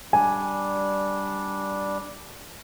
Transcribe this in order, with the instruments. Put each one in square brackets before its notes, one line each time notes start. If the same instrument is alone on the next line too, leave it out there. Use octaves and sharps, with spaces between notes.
[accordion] G3 D4 [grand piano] G#5